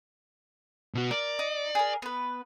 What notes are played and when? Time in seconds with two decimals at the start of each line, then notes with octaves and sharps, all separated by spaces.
0.94 B2 F#4
1.11 A#4 D5
1.39 D#4
1.75 G#4 A#4
2.02 B3 B4